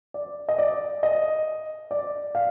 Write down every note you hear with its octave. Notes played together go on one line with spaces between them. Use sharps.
D5
D#5
D5
D#5
D5
F5